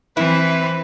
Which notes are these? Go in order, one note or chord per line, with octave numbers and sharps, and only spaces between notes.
E3 C4 E4 B4